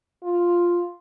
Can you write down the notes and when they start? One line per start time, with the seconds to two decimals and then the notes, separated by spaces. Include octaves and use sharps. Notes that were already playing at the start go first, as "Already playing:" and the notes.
0.24 F4